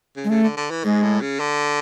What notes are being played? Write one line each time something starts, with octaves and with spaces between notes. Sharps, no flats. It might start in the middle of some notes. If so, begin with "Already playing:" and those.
C#3
G#3
C#3 A3
D3
D3
E3
G#2 G#3
A2
C#3
D3